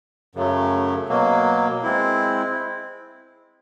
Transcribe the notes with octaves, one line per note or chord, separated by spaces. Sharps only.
F#2 C#3 F#3 A3
B2 F#3 A#3
G#3 C4 E4